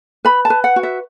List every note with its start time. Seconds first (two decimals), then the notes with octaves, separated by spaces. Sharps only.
0.25 B4 B5
0.45 A5
0.50 B4
0.64 F#5
0.76 F#4
0.83 E5